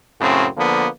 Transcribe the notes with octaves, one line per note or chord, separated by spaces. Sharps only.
F#2 A2 C#3 C4
D3 F3 A#3 B3